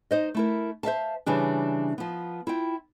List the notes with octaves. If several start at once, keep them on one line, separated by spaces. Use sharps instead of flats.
D#4 C5 D#5
A3 E4 A#4
C5 E5 F5 A5
C#3 E3 G3 D4
F3 B3
E4 F4 G5